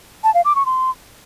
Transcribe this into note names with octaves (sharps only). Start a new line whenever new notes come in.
A5
F5
D6
C#6
C6